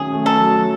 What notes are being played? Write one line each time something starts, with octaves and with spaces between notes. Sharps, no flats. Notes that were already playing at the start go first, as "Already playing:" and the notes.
Already playing: D#3 F#3 A3 C#4 G#4
A3
A4
F#3